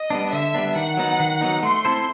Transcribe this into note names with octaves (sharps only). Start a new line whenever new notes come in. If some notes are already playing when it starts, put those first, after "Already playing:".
Already playing: D#5
G3 B3 D4
D3 E5
G3 B3 D4
D#3 F#5
F#3 B3 D#4
D#3
F#3 B3 D#4
A3 C6
C4 E4 A4 C5